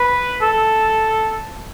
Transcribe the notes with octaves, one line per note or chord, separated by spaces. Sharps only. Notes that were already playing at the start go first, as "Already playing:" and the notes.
Already playing: B4
A4